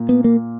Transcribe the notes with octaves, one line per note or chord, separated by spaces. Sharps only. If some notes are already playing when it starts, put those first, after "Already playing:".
Already playing: A#2
B3
A#3